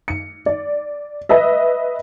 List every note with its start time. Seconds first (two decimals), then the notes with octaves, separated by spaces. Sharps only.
0.08 C#7
0.46 D5
1.29 B4 D#5 E5